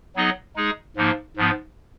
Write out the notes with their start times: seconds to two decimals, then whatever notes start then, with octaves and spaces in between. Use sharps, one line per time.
0.16 F#3 B3 D#4 G#4 D#5
0.56 G#3 D#4 G#4
0.97 G#2 F3 A#3 D#4
1.37 G#2 F3 B3